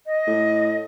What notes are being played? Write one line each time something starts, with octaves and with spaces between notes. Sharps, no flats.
D#5
A2